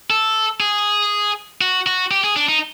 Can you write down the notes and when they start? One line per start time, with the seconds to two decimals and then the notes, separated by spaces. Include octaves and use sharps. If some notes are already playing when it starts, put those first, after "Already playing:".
0.10 A4
0.60 G#4
1.61 F#4
1.86 F#4
2.11 G4
2.24 G#4
2.36 D4
2.49 D#4